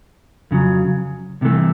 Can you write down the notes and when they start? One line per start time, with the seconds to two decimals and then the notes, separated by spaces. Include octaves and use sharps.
0.51 F2 C#3 F#3
1.41 C2 C3 E3 A3